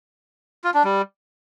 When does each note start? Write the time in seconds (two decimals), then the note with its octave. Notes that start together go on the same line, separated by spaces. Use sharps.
0.64 F4
0.74 D4
0.84 G3